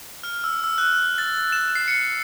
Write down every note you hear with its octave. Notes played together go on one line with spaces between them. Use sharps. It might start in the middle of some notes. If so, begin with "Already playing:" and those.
F6
E6
E6
F#6
A6
E7
C7
C#7